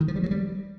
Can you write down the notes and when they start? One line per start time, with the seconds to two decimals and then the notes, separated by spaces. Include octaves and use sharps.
0.01 D#3
0.08 F3
0.16 G3
0.23 F#3
0.31 G3